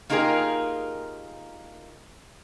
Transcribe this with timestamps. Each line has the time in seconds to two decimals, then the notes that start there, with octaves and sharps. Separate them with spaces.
0.10 A#3 D#4 F4 G4 G#4 A#4